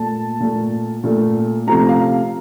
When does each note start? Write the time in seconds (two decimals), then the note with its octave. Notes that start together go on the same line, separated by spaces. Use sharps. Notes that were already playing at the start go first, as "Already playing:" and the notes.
Already playing: A#2 A3 A5
0.40 A#2 A3
1.04 A#2 A3
1.67 C3 F3 A3 A#5
1.89 F5